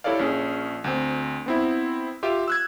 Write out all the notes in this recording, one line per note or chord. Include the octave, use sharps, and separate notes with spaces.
E4 G4 A4 C#5 D5 F5
A#1 C#4 G#4
D2 C4
B3 C4 E4
F4 G4 E5
E6 F#6 G#6